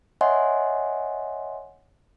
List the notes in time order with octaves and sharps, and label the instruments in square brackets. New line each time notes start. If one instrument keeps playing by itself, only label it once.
[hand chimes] C#5 D#5 E5 F#5 G#5 C6